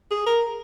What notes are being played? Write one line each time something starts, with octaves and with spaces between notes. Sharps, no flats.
G#4
A#4